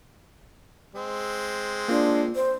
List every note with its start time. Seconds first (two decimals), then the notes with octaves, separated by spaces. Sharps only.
0.95 G#3 C4
1.89 A#3 D4 F4
2.36 C5